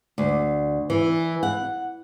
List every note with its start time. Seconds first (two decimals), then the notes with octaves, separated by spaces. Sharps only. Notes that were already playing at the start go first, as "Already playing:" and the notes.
0.18 D2
0.90 E3
1.43 F#5